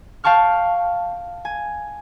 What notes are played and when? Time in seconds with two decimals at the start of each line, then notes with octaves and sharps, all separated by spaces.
0.24 F5 G5 A5 C#6 F6
1.45 G#5